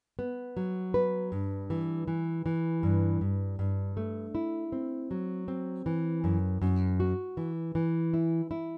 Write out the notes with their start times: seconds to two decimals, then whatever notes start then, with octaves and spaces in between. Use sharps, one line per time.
0.19 B3
0.57 F#3
0.94 B4
1.32 G2
1.70 E3
2.08 E3
2.46 E3
2.83 G2
3.21 G2
3.59 G2
3.97 A3
4.35 E4
4.72 C4
5.11 F#3
5.48 C4
5.86 E3
6.24 F#2
6.62 F#2
7.00 F#4
7.37 E3
7.75 E3
8.14 E4
8.51 E4